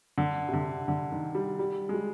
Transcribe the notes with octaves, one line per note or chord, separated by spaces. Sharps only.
D3
C3
D3
D3
D#3
G3
G3
G#3
G3